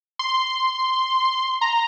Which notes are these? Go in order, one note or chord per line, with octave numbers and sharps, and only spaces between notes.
C6
A#5